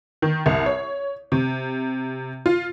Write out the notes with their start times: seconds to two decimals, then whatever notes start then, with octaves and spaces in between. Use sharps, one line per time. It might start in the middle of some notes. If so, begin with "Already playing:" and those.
0.22 D#3
0.46 C2
0.66 C#5
1.32 C3
2.46 F4